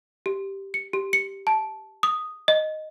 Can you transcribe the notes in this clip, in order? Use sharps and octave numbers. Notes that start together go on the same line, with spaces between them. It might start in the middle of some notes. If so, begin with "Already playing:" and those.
G4
C#7
G4
C#7
A5
D#6
D#5